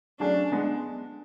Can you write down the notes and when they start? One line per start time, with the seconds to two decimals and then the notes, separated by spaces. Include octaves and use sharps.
0.20 F#3 A3 C#4 D4 G#4
0.51 G#3 B3 D4